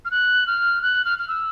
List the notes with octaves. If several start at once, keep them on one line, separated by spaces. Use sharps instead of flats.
F6
F#6
F6
F#6
F6
F6
E6